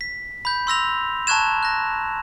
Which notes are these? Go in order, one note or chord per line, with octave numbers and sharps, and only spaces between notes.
B6
B5 G6
C6 E6 A#6 F7
A5 A#5 C#6 F#6 G#6 E7
F#6 A#6